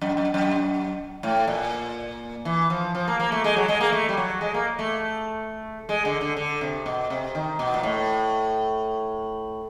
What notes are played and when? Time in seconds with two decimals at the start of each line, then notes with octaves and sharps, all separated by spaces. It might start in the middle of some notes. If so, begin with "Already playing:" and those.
0.01 F#2
0.17 F#2
0.34 F#2
1.23 A2
1.47 A#2
2.45 E3
2.70 F3
2.95 F3
3.08 A#3
3.20 A#3
3.32 A3
3.44 G#3
3.57 F#3
3.68 G#3
3.81 A#3
3.92 A3
4.09 G3
4.17 F#3
4.41 G#3
4.54 A#3
4.79 A3
5.89 G#3
6.05 D3
6.21 D3
6.37 D3
6.61 C3
6.86 B2
7.10 C3
7.35 D#3
7.59 B2
7.74 A#2
7.83 A2